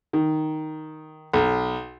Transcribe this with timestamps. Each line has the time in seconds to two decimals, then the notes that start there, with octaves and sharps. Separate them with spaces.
0.13 D#3
1.33 B1